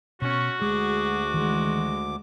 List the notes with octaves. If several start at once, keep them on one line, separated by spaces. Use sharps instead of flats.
B2 C#4 F#4
D2 G#3 G#4 D6
D#3 E3 G#3